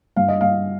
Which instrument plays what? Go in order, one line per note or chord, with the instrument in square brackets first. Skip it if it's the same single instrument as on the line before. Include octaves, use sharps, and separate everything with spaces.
[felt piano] G2 F5
D#5
G2 F5